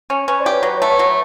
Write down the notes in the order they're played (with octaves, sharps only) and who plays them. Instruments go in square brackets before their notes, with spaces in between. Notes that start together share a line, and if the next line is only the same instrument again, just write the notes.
[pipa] C#4
[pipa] C#4 [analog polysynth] B4 C#5
[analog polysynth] C5 D5
[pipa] G4
[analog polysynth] B4 C#5
[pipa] F#3 [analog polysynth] B4 C#5
[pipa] A3
F#3